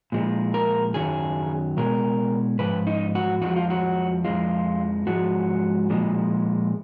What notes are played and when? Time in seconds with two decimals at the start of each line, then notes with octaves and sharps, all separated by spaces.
0.12 A#2 F3 G#3
0.54 A#4
0.94 F#2 D#3 F#3 G#4
1.77 B2 G#3 A#4
2.59 G#2 F3 B4
2.87 D#4
3.15 F#4
3.42 F2 F3 G#3 F#4
3.56 F4
3.70 F#4
4.24 F2 F3 G#3 F4
5.07 G#2 F3 G#3 F#4
5.90 A#2 F3 G#3